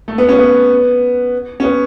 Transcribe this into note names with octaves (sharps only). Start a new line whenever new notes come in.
A3
B3
C#4
B3
C#4
B3